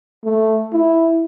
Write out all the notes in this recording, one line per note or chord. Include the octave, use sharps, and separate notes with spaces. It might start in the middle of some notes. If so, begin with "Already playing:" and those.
A3
E4